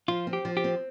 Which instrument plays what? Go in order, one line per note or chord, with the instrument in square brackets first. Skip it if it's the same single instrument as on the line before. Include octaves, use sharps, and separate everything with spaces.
[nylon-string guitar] F3 [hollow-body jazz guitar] F4
[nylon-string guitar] C4
[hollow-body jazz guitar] G4
[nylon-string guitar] F3
[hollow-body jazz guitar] G4
[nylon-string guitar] C4